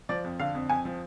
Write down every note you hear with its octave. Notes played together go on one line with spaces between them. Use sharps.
F3 D5
F2
D3 F5
F2
F2 G#5
F3